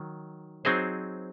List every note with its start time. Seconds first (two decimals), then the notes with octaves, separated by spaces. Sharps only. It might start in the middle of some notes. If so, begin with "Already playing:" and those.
Already playing: D#3 F#3
0.65 F#3 C4 D#4 G#4 C5